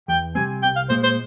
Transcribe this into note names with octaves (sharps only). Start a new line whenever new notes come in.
E2 G5
C3 G3 C4 G#5
C2 G5
F5
A#2 G#3 C5
C5